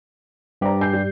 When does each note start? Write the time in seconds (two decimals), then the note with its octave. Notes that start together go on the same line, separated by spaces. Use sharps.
0.61 G2 G4 C5 D5 A#5
0.81 G#5 G6 C7
0.93 G3